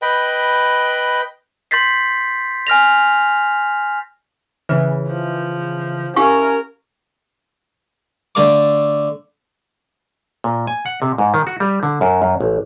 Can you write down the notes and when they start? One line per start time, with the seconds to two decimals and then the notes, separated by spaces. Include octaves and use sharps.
0.02 B4 D#5 G5 B5
1.71 C6 G6 A6 B6 C7
2.67 G#5 F6 A#6 F7
4.69 C#3 E3 B4
5.07 F3
6.16 C#4 E4 G4 A#4 F5 C#6
8.35 D3 A3 F5 D6
10.44 A#2
10.67 G#5
10.86 F#5
11.02 C3
11.18 G#2
11.34 D#3
11.47 F#4
11.60 G3
11.83 D3
12.01 F#2
12.22 F#2
12.41 A1